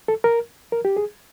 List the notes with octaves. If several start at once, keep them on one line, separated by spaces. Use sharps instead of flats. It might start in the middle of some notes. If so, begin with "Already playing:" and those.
A4
A#4
A#4
G4
G#4